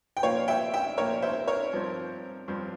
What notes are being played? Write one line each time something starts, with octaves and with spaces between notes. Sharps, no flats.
G5
A#2 F3 A#3 C#5 F5
E5 G5
E5 G5
A#2 F3 A#3 A#4 C#5
C5 E5
A#4 C#5
G2 F3 C4
G2 F3 C4